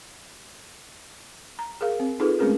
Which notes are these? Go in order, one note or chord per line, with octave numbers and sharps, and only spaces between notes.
A#5
G#4 A#4 F5
C4
D#4 F4 G#4 A4 B4
G#3 A3 C4 C#4 G#4 A#4